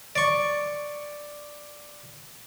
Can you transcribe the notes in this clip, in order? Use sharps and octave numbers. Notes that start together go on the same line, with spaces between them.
D5 C#6